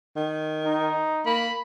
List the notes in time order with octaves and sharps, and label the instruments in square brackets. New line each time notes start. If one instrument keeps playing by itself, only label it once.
[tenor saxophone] D#3
[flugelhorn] D#4
[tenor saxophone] A#3 [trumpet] B5